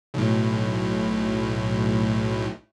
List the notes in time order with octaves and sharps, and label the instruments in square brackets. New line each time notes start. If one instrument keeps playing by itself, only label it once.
[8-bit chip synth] B1 A2